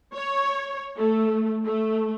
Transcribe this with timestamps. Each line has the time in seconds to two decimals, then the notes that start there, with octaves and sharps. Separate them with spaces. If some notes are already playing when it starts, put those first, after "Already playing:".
0.15 C#5
0.98 A3
1.65 A3